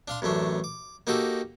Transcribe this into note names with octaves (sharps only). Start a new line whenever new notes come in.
D4 F5 C6
A1 F#2 A3 D4
D6
A#3 D#4 F#4 G4 A4